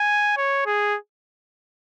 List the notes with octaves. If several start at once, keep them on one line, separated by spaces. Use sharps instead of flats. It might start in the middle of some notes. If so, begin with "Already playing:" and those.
Already playing: G#5
C#5
G#4